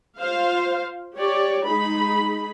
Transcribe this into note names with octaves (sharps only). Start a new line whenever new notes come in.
F4 C5 F5
G4 C#5 D5
G#3 D#4 G#4 B5